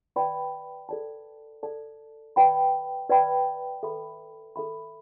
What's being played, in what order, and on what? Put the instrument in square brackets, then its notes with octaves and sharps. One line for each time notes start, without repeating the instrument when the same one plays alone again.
[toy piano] B4 D5 G5 B5
A4 D5 A5
A4 D5 A5
B4 D5 G5 B5
B4 D5 G5 B5
A4 E5 B5
A4 E5 B5